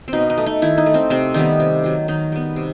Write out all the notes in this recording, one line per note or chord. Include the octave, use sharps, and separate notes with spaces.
C4
B2 D#4
D#4
A3
D#4
D#3 E4
D#4
A3
C4
C3 C4
D#3 G3 B3
C3
D#3 F#3
D#3 D#4
G3 B3
C3